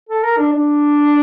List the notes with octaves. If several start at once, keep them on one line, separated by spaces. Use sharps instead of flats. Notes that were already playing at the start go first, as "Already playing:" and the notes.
A4
A#4
D4
D4